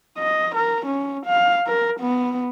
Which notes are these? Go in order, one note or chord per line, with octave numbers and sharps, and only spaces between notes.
D#5
A#4
C#4
F5
A#4
B3